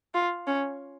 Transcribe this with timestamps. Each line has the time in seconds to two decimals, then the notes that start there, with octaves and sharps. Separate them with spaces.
0.14 F4
0.47 C#4